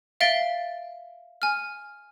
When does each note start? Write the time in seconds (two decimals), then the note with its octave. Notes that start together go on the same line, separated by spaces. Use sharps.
0.21 E5 F5 A6 D7 G7
1.42 G#5 F6